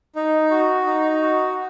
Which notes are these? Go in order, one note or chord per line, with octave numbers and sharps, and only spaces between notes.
D#4
F#4
D#4
F#4